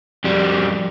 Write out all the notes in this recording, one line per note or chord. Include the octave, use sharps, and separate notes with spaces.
F2 G3